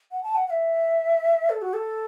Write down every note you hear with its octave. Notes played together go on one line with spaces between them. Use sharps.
F#5
A5
F#5
F#5
E5
A4
F#4
A4